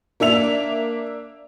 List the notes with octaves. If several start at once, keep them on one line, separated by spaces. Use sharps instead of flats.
A#3 D4 E5 F7